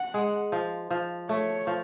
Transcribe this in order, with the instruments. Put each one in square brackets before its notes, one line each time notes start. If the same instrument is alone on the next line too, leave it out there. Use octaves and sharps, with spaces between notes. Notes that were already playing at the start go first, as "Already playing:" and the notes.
Already playing: [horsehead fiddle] F#5
[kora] G#3
F3
F3
[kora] A3 [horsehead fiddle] C#5
[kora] F3